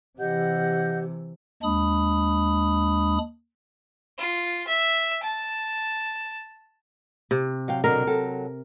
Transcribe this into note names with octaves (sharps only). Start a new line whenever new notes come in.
C3 E3 G4 D#5 F#5 G6
D#2 G#3 D4 B5 D#6
F4
E5
A5
C3
F#3 F5 G5
B2 D3 F#3 A#4
C3 F#3 A4